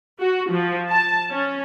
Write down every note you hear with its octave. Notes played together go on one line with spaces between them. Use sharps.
F#4
F3
A5
C#4